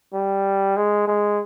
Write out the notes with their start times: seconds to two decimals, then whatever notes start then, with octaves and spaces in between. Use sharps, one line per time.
0.13 G3
0.77 G#3
1.07 G#3